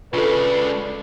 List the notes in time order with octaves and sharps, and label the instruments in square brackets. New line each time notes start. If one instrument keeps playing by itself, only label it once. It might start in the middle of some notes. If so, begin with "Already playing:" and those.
[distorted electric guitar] C#2 C#3 [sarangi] D4 [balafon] F4 A4 [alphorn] B4